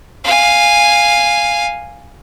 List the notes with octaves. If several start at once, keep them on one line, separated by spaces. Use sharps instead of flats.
F5 G#5